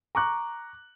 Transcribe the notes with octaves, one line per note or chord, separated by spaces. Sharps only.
A#5 C#6 D6 F#6